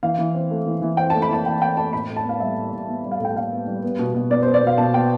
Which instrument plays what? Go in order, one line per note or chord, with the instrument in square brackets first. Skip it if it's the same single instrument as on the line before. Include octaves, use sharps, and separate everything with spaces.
[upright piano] E3 F5
E3
C4
A3
E3
E3
C4 G5
A5
A3
B5
E3 A5
E3 G5
C4 G5
A3 A5
A2 B5
A2
A5
B3 F5
G3 E5
A2
A2
B3
G3
F5
A2 G5
A2 F5
B3
G3
B3
B2
B2
B3 D5
C5
B3
D5
B2 F5
B2 A5
B3 G5